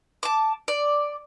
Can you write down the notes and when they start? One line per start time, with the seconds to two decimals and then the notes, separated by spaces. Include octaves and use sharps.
0.23 A5 D6
0.68 D5